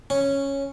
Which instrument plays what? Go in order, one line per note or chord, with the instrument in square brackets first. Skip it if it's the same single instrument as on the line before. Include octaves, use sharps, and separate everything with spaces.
[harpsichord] C#4